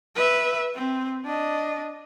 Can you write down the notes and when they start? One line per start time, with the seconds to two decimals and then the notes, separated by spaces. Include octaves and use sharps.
0.15 B4 E5
0.75 C4
1.26 D4 D#5